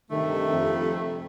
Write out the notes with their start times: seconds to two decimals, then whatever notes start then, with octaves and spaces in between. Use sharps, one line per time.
0.11 G2 C3 D#3 A3
0.51 F2